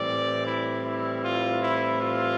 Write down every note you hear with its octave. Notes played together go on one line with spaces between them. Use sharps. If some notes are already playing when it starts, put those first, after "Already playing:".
Already playing: A2 E3 G3 C4 D5
E4
E4
F4
E4
F4